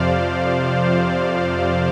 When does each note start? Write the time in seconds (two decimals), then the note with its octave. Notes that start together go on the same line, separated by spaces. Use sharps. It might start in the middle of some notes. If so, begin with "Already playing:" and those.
Already playing: F2 C3 F3 C5 D5 F5